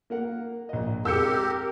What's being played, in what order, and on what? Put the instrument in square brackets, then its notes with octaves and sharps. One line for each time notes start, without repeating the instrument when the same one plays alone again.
[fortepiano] A#3 A#4 F#5
A#1 D#5
[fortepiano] G#3 C4 [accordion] G4 [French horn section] A#4 [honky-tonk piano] E6 G6 C#7